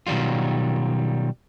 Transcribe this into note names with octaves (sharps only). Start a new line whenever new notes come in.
B2 D#3 F#3 G3 F4